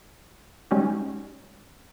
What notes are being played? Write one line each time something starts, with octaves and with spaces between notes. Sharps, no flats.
G3 G#3 C#4 D#4 F#4 G4